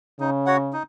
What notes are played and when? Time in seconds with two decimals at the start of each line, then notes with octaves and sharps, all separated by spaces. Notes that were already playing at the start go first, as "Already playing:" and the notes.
0.20 C#3 D#4
0.46 F#4 C#5 F#5
0.73 D#4